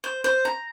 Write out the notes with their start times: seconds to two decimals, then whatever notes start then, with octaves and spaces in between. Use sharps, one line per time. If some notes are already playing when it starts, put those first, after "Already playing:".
0.04 C5
0.24 C5
0.45 A#5